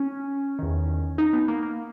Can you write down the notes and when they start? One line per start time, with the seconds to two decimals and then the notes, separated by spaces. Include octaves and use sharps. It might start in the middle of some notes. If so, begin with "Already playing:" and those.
Already playing: C#4
0.59 E2 D#3
1.18 D#4
1.33 B3
1.48 A#3
1.63 A#3